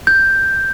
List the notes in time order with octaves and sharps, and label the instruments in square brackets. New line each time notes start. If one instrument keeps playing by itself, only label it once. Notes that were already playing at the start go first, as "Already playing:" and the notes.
[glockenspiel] G6